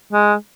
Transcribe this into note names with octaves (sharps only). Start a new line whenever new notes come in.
G#3